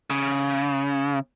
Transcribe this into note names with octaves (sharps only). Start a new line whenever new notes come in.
C#3